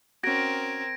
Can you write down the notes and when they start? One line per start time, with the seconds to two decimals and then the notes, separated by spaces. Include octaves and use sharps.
0.23 C4 C#4 F#4 A#4 G#6 A#6 D7